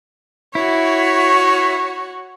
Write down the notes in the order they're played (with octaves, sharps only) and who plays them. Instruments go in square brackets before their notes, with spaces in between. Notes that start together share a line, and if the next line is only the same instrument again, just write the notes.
[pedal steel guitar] E4 [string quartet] F#4 C#5